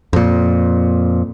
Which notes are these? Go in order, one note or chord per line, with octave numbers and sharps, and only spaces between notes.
F2 A#2